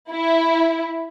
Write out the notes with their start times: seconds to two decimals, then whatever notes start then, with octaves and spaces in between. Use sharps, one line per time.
0.11 E4